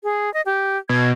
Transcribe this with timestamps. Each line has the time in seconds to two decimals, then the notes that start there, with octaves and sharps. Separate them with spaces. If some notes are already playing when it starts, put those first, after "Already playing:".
0.04 G#4
0.34 D#5
0.46 G4
0.89 B2 G#6